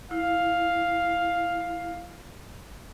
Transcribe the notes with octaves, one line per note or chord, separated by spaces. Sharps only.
E4 F5